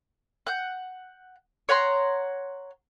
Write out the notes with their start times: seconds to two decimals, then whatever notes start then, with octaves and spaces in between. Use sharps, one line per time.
0.47 F#5 G6
1.69 C#5 F#5 A#5 C6